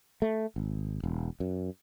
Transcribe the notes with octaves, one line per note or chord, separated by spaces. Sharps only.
A3
G#1
E1
F#2